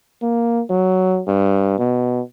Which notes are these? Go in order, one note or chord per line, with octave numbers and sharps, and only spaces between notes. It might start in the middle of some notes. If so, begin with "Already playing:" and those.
A#3
F#3
G2
B2